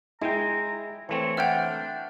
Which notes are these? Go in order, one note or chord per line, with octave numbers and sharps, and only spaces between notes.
G#3 E4 G5 A#5
E3 A3 C4 C#5
D4 E5 F#5 G5 F6 G6